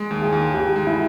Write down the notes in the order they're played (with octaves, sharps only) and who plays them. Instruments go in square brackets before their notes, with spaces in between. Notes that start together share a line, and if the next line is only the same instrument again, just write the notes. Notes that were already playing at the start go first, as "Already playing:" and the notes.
Already playing: [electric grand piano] G#3
D#2
[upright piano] G#4
[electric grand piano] D#2
[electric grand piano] D#2 [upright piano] G4
[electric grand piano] G#3
[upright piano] E4